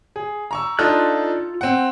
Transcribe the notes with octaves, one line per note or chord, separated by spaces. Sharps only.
G#4
A#5 C#6 E6
D4 D#4 F4 A4 F6 F#6
C4 F#5